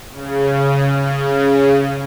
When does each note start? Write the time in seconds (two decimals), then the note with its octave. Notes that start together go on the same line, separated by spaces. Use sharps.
0.12 C#3
0.96 C#3